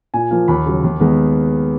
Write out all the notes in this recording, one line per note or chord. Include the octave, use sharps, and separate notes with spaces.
A#2 G#5
F3 A#3
D#2 B5
C#3 F#3
D#2
D#3 G#3 B3